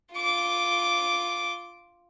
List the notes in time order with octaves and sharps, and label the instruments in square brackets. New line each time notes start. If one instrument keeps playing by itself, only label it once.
[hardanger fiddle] F4 D6